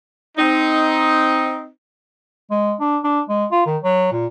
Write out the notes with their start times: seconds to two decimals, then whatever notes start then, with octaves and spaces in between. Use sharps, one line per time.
0.38 C4 D#4
2.51 G#3
2.80 D4
3.04 D4
3.29 G#3
3.52 F4
3.66 D#3
3.83 F#3
4.13 A#2